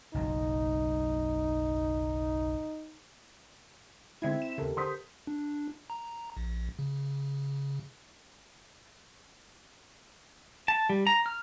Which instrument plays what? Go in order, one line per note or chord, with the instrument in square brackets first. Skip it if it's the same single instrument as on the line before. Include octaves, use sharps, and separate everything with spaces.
[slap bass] F#1 B1 F#3 [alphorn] D#4
[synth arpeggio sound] D3 G#3 G#6 [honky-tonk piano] C4 E4 [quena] E5
[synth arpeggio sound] E7
[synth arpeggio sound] D#2 C#3 [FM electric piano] G4 A4 A#4
[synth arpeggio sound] D3 [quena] C5 [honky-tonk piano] C6 D#6 B6
[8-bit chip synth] D4
A#5
A#1
C#3
[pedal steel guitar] A5
G3
A#5
F6